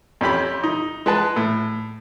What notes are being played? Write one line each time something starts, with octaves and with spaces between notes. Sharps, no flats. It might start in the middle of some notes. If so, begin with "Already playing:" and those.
F2 C#4 G4 B5
D#4
G#3 B4 A5
A2